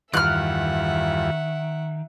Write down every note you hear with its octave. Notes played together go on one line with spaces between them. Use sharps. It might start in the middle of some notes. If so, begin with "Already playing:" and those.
E2 G2 D#3 F4 E5 F#5 F6 F#6